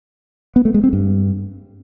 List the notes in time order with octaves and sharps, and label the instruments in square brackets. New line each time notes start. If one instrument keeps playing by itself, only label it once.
[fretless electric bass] B3
A3
G#3
C4
G2